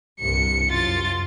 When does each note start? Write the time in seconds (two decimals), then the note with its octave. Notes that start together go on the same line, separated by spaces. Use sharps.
0.20 C2 G2 C#7
0.69 F#2 F4 A6